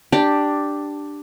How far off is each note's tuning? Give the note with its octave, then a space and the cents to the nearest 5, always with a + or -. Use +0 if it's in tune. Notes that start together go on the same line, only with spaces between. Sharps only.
D4 +5 G4 +0